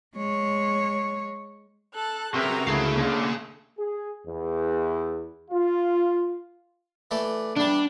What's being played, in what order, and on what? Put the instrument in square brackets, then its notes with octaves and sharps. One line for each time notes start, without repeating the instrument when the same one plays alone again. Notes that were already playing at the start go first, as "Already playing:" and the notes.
[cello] G#3 C#5
[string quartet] A4 A5 F#6
[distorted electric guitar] C3 [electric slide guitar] F#4 A#4 [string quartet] G#4 B4 A#5 [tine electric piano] E5 C6
[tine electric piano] C#2 D3 E4 [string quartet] A3 [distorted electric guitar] G#4 F5
[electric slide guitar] D3 A#3 [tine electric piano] C#4 D4
[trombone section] G#4
E2
F4
[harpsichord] E3 A3 D5
[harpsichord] E2 G3 [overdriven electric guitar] D4